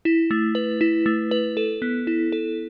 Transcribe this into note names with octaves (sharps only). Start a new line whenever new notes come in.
E4
A3
B4
E4
A3
B4
A4
B3
E4
A4